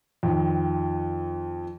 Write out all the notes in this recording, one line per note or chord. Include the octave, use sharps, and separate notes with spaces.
F2 D#3